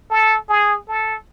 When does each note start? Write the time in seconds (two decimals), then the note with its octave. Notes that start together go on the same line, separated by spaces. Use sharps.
0.10 A4
0.49 G#4
0.87 A4